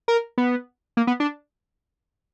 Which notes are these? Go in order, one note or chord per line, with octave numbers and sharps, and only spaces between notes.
A#4
B3
A#3
B3
D4